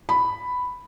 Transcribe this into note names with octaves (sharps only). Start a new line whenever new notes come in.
B5